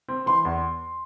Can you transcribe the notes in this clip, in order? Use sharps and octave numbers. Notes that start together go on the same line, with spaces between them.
C4
E3 C6
E2